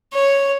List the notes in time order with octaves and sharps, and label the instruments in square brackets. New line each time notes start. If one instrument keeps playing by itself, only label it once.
[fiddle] C#5